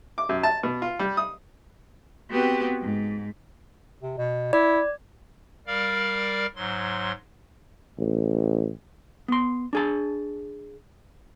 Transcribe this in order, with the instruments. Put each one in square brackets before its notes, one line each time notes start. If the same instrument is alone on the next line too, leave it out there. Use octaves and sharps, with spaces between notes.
[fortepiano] D6
F#2
A5
B2
F4
G3
D#6
[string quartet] B3 C4 F#4 G4 B4
G#2
[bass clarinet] C3
B2
[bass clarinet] E4 [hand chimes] D5
[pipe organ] G3 A#4 D5 F5 F6
G#2 F#3 C6
[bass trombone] A1
[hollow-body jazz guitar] B3 C6
D4 G#4 A5